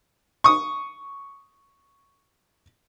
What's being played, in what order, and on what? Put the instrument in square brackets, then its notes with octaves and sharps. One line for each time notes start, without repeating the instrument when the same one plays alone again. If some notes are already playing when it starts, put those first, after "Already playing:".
[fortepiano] C#6 D#6